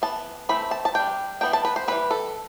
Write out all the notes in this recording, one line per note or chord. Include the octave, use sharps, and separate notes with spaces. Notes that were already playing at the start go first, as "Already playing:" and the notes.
E3 B3 A5
E3 A3 C4 B5
A5
A5
G3 D4 G5
E3 G3 B3 D4 G5
A5
B4
C5
E3 G3 C4 B4
A4